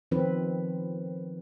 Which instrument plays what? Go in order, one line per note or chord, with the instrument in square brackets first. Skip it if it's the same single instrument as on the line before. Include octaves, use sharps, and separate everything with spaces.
[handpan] D#3 F3 C4 B4